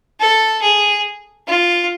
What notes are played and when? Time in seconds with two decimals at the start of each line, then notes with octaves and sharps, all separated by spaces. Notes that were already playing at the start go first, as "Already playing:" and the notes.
0.20 A4
0.62 G#4
1.47 F4